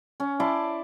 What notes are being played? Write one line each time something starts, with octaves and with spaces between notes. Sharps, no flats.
C#4
E4 D5 A5 C6